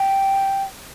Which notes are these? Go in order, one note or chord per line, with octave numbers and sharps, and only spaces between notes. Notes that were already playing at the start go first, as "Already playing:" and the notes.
Already playing: G5